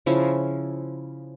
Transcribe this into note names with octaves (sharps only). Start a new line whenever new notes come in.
C#3 F3 C#4 E4